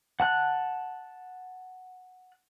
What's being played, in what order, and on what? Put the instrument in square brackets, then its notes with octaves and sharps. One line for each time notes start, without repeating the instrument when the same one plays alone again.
[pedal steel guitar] F#5 A5 F#6